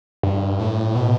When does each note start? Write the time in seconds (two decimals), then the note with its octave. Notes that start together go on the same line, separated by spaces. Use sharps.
0.23 G2
0.60 A2
0.95 B2